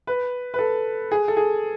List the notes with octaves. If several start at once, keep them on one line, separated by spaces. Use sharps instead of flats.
B4
B4
A4
G#4
A4
G#4